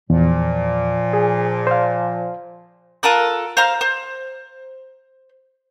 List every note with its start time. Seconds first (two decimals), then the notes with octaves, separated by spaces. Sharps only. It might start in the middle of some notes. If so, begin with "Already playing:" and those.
0.10 E2 A#2 F3
1.13 G#4
1.67 C5 F5
3.03 F4 A4 A#4 F#6
3.57 C5 F5 A#5 F6
3.81 C5